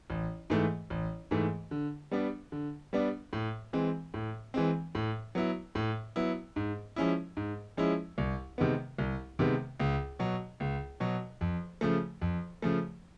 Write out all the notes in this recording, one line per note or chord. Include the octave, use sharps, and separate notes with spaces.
A1
G#2 E3 A3
A1
G#2 E3 A3
D3
G3 B3 D4
D3
G3 B3 D4
A2
E3 G#3 C4
A2
E3 G#3 C4
A2
F#3 B3 E4
A2
F#3 B3 E4
G#2
F3 G#3 C#4 E4
G#2
F3 G#3 C#4 E4
C2
C3 D#3 G#3 B3
C2
C3 D#3 G#3 B3
C#2
B2 F#3
C#2
B2 F#3
F2
C#3 F3 A3
F2
C#3 F3 A3